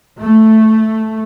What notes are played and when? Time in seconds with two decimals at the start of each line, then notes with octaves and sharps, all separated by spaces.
0.21 A3